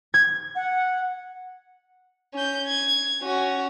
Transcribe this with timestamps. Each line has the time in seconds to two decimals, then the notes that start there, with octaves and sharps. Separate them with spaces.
0.14 G#6
0.55 F#5
2.34 C#4 G6
2.67 G#6
3.21 C#4 F#4